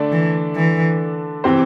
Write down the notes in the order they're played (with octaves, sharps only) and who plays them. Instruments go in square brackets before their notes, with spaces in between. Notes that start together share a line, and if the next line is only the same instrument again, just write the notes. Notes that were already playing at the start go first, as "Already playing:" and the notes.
Already playing: [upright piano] D3 A3 D4 A4 D5
[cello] E3
E3
[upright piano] C3 E3 C4 G4 C5